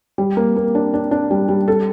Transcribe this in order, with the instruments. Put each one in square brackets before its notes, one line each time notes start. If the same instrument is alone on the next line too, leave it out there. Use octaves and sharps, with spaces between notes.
[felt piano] G3
A#3
A#3
D4
D4
D4
G3
G3
A4